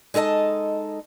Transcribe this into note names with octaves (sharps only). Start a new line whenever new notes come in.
G#3 D#4 A4 D#5 A5